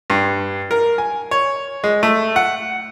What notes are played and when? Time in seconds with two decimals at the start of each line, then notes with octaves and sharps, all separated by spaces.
0.10 G2
0.71 A#4
0.98 G#5
1.31 C#5
1.84 G#3
2.03 A3
2.36 F#5